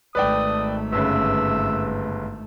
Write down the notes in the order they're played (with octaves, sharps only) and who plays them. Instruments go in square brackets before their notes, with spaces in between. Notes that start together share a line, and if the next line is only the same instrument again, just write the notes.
[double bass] G#1 A3 [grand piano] B4 D5 G5 [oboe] D#6
[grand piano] G1 C#3 B4 [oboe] E5